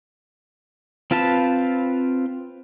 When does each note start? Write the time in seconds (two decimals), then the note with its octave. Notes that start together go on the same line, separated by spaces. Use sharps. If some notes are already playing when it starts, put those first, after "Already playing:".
1.11 C4 F4 B4 A5